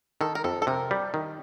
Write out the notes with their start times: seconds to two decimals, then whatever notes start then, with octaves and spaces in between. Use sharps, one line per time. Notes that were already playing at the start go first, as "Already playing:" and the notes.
0.21 D#3 A4
0.35 A#4
0.44 F2 A4
0.62 A4
0.67 C3 A#4
0.91 G3
1.14 D#3